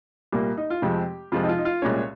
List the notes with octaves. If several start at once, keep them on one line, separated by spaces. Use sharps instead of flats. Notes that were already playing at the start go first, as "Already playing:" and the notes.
C2 A#2 G3 A#3
D#4
F4
F2 C3 F3 G#3 C4 G4
F2 C3 F3 G#3 C4 F4
D#4
F4
D#4
F4
C2 A#2 G#3 C#4 C#5